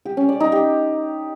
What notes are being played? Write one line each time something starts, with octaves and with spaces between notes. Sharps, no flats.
G4
C#4
D5
D#4
G4